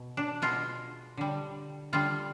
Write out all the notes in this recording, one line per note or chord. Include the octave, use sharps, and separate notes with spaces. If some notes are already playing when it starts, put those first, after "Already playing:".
Already playing: B2
D4
B2 G#3 F4
D3 G3
D3 G3 F4